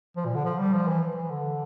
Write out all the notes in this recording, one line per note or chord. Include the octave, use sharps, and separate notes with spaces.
F3
A#2
D3
F3
G3
F3
E3
E3
D3